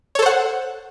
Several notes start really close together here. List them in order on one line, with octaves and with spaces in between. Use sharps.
C#5 A4 C5 F#5